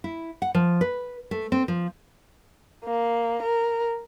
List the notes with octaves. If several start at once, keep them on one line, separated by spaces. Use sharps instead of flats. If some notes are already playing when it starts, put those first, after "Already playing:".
E4
F#5
F3
B4
A3
C4
F3
A#3
A#4